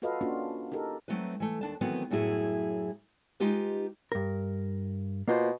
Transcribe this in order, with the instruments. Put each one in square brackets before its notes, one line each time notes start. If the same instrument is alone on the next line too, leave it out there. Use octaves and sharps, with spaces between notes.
[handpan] F4 F#4 A4 B4 D#5 F5
A#3 C#4 D4 F4 F#4
D#4 G4 A4 A#4
[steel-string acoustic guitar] F#3 A3 C4 D#4 B4
E3 A3
D#2 D4 A5
D#3 E3 F#3 A3 B3 C4
F#2 A2 F#3 E4 G#4
G#3 D#4 F4 G4 B4
[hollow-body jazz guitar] G2 A#4
[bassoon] B2 [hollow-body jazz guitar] A#3 F4 C5